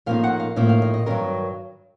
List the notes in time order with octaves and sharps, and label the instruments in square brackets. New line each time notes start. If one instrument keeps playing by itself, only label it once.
[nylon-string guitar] A2 F3 A#3 D#4 F5
F#5
F5
A2 F3 A#3 D#4 E5
F5
D#5
D#5
G2 D#3 F#3 A#4